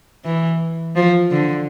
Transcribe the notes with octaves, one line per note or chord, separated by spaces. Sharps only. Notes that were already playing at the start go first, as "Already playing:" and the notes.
E3
F3
D3